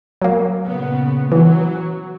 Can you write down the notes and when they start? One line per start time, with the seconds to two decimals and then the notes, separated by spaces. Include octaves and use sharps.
0.22 F#3 A#3
0.66 A#2 C#3 B3
1.32 E3 F#3